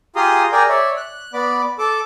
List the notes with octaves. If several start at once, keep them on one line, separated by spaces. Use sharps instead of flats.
F4 G4 G#4 A#5 C6 D#6
G#4 A#4 D5 G5 G#5 A#5
C#5 D5 E5
F#6
B3 D5 B5 D6
A4 A5 D6